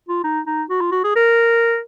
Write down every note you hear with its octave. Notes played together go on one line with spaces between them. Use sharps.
F4
D#4
D#4
F#4
F4
F#4
G#4
A#4